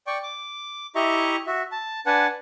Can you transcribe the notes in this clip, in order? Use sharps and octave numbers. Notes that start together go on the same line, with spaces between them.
D5 G5 C#6
D6
E4 G4 D#5 E5 A#5 C#6
F#4 E5
A5
D4 B4 F#5 G#5 A5